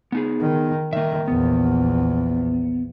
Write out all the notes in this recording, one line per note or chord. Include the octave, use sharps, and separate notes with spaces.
B3 D#4 G#4
D#3
D#3 A#3 E5
A#1 E2 B3